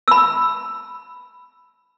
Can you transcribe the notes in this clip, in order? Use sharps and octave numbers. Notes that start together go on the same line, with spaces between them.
B5 E6